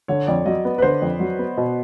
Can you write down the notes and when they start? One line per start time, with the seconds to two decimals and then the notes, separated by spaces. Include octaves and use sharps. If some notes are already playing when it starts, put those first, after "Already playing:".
0.08 D3 C#5
0.27 F2 D5
0.46 F#3 D#5
0.65 B3
0.78 B4
0.82 D3 C5
1.02 F2
1.20 F#3
1.39 B3
1.57 B2